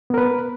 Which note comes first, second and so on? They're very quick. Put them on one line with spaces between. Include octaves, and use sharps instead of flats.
B3 A#4 B4